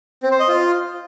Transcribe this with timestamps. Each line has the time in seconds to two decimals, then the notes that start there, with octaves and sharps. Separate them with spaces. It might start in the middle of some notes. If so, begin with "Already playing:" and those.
0.23 C4
0.31 C5
0.40 D#5
0.48 F4